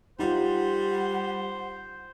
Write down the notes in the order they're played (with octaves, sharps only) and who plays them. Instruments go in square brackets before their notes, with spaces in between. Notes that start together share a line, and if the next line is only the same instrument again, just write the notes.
[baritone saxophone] G3 [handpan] D#4 F4 [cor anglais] C5 [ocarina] F#5